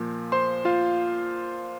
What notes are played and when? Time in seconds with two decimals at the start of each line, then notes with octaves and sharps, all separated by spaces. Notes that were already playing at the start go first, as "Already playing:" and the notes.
Already playing: A#2 F3 A#3
0.32 C5 C6
0.65 F4 F5